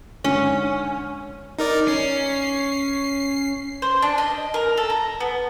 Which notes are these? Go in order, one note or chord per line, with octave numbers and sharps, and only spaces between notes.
G#2 D3 C#4
D#4 A#4 D5
C#4 C7
C5
D4
D#5
A#4
A4
A#5
B3